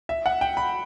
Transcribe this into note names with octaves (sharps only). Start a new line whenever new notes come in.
E5
F#5
G5
B5